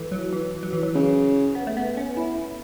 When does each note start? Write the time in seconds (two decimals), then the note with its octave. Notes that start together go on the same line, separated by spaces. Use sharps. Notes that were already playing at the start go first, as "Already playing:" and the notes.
Already playing: E3 A3
0.12 F#3
0.33 E3
0.63 F#3
0.73 E3
0.83 F#3
0.95 C#3
1.55 B3
1.67 A3
1.77 B3
1.97 C#4
2.17 E4